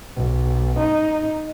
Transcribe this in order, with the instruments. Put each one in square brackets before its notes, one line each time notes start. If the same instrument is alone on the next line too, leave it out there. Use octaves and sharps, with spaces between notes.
[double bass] B1
D#4